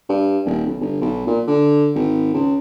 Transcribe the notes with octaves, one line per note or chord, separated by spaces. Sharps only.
G2
D#1
B1
G1
B1
A#2
D3
G#1
C#2